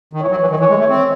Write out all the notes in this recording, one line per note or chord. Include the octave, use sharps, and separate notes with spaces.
D#3
E3 C#5
F#3
E3
D#3
E3 C#5
G#3
A3
C4